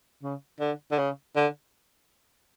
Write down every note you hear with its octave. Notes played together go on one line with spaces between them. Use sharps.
C#3
D3
D3
C#3
D3